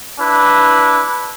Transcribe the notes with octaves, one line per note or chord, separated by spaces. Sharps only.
D4 E4 B4